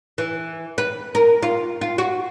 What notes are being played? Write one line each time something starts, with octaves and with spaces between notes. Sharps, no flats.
E3
B4
A#4
F4
F4
F#4